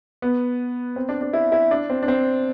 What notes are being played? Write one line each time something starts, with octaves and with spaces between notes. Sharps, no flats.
B3
C4
D4
D4
E4
E4
D4
C4
D4
C4